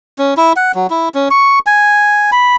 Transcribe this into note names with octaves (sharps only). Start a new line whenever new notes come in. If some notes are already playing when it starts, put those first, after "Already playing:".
C#4
E4
F#5
F#3
E4
C#4
C#6
G#5
B5